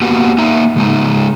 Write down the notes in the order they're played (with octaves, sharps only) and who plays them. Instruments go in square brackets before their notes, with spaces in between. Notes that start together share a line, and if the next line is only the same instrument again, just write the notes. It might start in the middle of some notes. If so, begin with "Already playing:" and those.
[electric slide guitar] A#3 B3 F#4 G4
A#3 D#4 E5 A#5
C#3 G#3 D#4